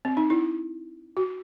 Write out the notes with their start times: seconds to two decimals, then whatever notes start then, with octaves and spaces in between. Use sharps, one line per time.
0.05 C4
0.17 D#4
0.30 E4
1.17 F#4